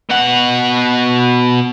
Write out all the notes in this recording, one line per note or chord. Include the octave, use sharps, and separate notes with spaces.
B2 F#5